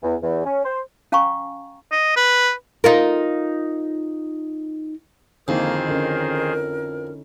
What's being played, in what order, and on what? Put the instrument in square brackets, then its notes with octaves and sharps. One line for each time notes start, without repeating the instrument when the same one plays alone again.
[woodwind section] E2
E2
C#4
C5
[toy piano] C#4 F5 G5 G#5 A#5 C#6
[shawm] D#5
B4
[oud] D#4 F4 A#4
[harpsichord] F2 [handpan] D3 D#4 E4 [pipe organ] D#3 G#4 C5 [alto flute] A#3
[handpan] D3 C#4 [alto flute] A#4